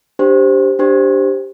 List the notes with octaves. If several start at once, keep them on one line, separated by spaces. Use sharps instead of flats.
D4 G4 C5
D4 G4 C5